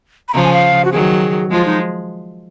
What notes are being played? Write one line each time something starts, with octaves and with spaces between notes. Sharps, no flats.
B5
C#3 F3 A#5
G#5
F5
F#4
D#3 F#3 G#4
F3 G#3 F4
D#4